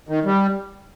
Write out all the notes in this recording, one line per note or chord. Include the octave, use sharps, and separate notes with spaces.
D#3
G3